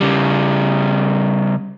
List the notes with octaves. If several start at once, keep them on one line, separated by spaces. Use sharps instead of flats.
C#3 G3